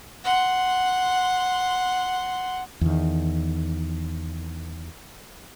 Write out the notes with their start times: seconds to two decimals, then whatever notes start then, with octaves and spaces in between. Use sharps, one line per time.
0.25 F#5 C6
2.81 E2 D#3